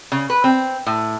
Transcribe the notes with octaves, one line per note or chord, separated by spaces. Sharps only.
C#3
B4
C4
A2